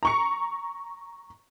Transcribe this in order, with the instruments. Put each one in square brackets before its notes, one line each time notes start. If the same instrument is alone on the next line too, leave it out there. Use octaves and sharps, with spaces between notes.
[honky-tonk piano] A#5 C#6 C#7